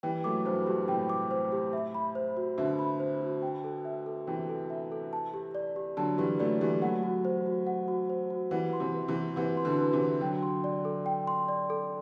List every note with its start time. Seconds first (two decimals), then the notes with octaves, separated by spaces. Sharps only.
0.03 E3 G3 G5
0.24 F#3 A3 D6
0.45 G2 B2 C5
0.66 G2 B2 G4
0.88 A2 C3 G5
1.09 D6
1.31 C5
1.52 G4
1.73 E5
1.94 B5
2.15 C5
2.37 F#4
2.58 B2 D3 E5
2.79 B5
3.00 C5
3.21 F#4
3.42 G5
3.64 A4
3.85 E5
4.06 A4
4.27 C3 E3 G5
4.49 A4
4.70 E5
4.92 A4
5.13 A5
5.34 G4
5.55 D5
5.76 G4
5.97 D3 F#3 A5
6.18 E3 G3 G4
6.39 F#3 A3 D5
6.61 E3 G3 G4
6.82 F#3 A3 F#5
7.03 F#4
7.25 C5
7.46 F#4
7.67 F#5
7.88 F#4
8.10 C5
8.30 F#4
8.51 E3 G3 F#5
8.73 C6
8.80 C3 E3
8.94 B4
9.08 C3 E3
9.15 G4
9.36 C3 E3 F#5
9.57 C6
9.65 B2 D3
9.79 B4
9.93 C3 E3
10.00 G4
10.21 D3 F#3 G5
10.43 C6
10.64 D5
10.85 A4
11.06 G5
11.27 C6
11.48 D5
11.70 A4